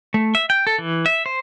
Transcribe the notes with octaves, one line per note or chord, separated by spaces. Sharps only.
A3
E5
G5
A4
E3
E5
C5